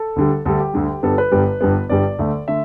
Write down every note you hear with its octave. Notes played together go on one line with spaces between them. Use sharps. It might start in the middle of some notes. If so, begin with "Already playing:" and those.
Already playing: A4
D2 D3 G3
D2 D3 G3 A4
G4
D2 D3 G3
G1 G2 G3 B3 A4
B4
G1 G2 G3 B3
G1 G2 G3 B3
G1 G2 G3 B3 D5
D2 D3 A3
D3 A3 E5